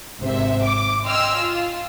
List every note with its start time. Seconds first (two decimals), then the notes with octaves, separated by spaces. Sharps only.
0.21 G#1 C3 C5 E5
0.63 D6
1.06 D#5 G5 G#5 C6 E6 F6
1.36 F4